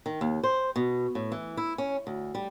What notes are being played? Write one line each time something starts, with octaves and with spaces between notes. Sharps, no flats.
D#3
D#2
C5
B2
A2
E3
E4
C#4
D2
G3